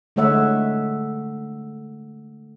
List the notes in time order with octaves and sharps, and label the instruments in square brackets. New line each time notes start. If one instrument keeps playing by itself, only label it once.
[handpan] D3 G#3 A3 C#5 E5 F#5